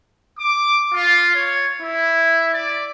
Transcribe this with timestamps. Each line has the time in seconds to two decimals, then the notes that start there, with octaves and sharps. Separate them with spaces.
0.38 D6
0.94 F4
1.35 C#5
1.81 E4
2.53 D5